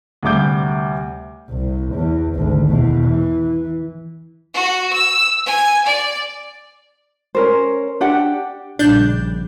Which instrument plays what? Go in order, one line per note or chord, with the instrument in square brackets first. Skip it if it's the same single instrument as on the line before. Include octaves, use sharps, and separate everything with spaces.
[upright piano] D2 C3 G3 D6 G6
[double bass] C2
E2
G#1 D2
E2 B2
E3
[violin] F#4
E6
G#5
D5
[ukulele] C#4 A#4 C5
D4 G4 F#5
[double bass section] A#1 C#3 G3 [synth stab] D4 G6